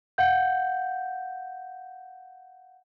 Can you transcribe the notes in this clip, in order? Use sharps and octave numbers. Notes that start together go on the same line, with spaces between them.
F5 F#5 G6